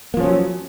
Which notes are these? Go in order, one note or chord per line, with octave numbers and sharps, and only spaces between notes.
F3 F#3 A#3 C#4